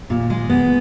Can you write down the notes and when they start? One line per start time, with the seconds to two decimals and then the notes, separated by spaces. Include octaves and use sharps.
0.10 A#2
0.30 G#3
0.50 B3